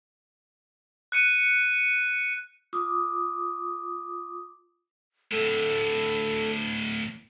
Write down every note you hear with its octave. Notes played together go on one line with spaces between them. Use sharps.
F#6 C#7 D#7
F4 D6 D#6
D2 A2 A4